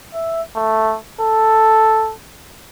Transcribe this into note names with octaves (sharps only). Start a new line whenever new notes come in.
E5
A3
A4